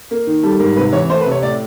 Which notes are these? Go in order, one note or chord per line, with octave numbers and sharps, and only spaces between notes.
A#3
D#3
G3 A4
G#2 A#4
C3 B4
E3 C#5
A3 C5
B4
C3
C#5
A2 D5